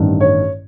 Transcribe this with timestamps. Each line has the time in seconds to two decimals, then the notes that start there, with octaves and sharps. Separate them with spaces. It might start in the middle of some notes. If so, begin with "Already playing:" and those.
Already playing: A1 G2 D#3 G3
0.20 C#5